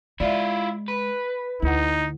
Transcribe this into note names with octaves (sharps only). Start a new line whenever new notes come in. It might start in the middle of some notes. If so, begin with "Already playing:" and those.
G#3 E4 F4 D5 E5
B4
D2 D#4 E4 F#5